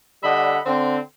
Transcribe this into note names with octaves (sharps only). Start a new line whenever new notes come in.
D3 G3 D#5 E5 F#5 B5
D3 C4